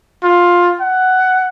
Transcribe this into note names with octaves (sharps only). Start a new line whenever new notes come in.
F4
F#5